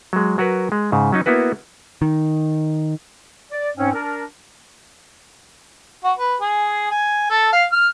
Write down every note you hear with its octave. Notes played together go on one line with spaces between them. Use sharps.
F#3 G#3
F#3 F#4 A#4 B4
G#3
G#2 C#3
F#3 C#4 D#4 D#5
A#3 B3 E4 F#4 B4
D#3
D5
G#2 C4 C#4
D4 A#4
F#4
B4
G#4
G#5
A4
F5
F6